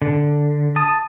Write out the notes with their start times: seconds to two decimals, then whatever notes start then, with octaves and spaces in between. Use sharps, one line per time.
0.02 D3
0.76 A5 D#6